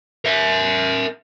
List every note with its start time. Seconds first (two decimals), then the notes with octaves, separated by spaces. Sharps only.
0.25 A#4 E5